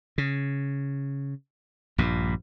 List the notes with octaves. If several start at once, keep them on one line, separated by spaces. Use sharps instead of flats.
C#3
A#1 G2 A#2